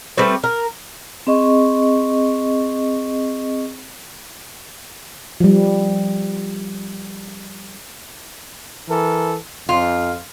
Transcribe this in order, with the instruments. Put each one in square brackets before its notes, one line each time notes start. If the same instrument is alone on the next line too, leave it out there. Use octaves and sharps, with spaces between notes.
[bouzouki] G3 A3 C4 B4
A#4
[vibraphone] C4 G#4 D#5 C#6
[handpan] F3 G3
[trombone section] E3 A4 A#4
[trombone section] F2 [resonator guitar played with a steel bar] F4